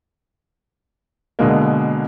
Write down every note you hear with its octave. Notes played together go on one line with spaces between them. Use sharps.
B2 D3 G#3 A#3